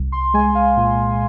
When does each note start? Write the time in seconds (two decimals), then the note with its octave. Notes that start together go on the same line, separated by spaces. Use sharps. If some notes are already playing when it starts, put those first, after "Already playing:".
Already playing: C2
0.12 C6
0.34 G#3 G#5
0.55 F5
0.77 A#2